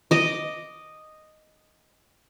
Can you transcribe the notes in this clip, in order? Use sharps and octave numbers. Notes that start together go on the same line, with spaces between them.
D#5 D6